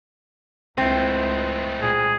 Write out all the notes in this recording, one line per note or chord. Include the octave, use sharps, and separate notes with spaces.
C#2 G#3 A3 C4 E4
A#2 G#4